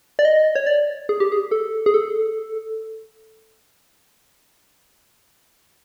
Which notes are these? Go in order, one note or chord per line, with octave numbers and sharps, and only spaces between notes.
D5
D#5
C#5
D5
G#4
G4
G#4
A4
G#4
A4